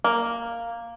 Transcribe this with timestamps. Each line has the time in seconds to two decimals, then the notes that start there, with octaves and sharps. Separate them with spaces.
0.04 A#3